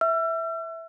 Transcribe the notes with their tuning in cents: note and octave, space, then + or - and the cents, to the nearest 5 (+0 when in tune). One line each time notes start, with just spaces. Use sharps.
E5 -5 E6 +40